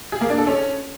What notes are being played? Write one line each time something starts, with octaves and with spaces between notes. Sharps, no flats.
G#4
A#3
D4
A4
C#4